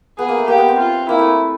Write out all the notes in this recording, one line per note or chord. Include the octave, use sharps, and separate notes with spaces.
B3 G#4
A#3
A3
A#3 G4
B3
C4
F4
A#3 E4
A3